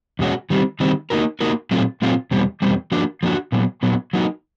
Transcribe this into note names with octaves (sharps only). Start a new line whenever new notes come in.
E2 B2 G#3 C#4 F#4
D#3 G3 C4
D#3 G3 C4
A#3 D#4 F#4 A#4
A#3 D#4 F#4 A#4
A#2 F#3 A3 C4 F4
A#2 F#3 A3 C4 F4
E2 B2 G3 C4
E2 B2 G3 C4
F3 A#3 D4 F#4
F3 A#3 D4 F#4
A#2 F#3 B3
A#2 F#3 B3
F#3 A#3 D#4 F#4